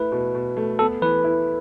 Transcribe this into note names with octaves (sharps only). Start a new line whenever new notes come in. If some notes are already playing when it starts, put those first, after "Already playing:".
Already playing: A3 E4 B4
B2
B2
A3
B3 A4
E3 B4
E4